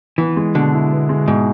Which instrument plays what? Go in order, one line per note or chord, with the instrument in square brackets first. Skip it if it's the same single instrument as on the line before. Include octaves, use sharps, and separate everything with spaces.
[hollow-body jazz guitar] E3 [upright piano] B3
[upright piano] G#3
[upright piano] B2 [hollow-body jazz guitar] D3
[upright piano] E4
B3
G#3
[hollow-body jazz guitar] G#2 [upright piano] B2